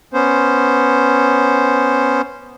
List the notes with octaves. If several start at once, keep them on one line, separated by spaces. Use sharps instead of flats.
B3 C#4 C5